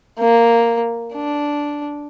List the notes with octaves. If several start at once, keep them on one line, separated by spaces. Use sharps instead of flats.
A#3
D4